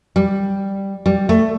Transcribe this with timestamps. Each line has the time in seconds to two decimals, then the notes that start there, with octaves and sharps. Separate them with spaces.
0.16 G3
1.06 G3
1.29 A3